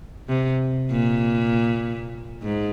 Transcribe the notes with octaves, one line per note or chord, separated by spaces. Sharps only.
C3
A#2
G#2